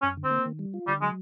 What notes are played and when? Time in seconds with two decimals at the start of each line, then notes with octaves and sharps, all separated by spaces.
0.02 F#2 C#4
0.17 D3
0.24 C4
0.31 A#3
0.45 D#3
0.59 G3
0.74 F4
0.87 D3 G3
1.02 F#3 G#3